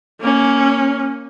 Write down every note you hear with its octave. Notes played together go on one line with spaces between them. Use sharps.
A#3 C#4